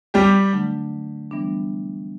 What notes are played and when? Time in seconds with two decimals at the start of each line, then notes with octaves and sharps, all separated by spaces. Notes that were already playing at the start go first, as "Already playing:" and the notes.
0.14 G3 G4
0.53 D3 F#3 A3 D4
1.31 E3 G3 B3 D4